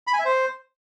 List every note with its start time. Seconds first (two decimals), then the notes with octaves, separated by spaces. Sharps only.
0.07 B5
0.13 G#5
0.19 E5
0.25 C5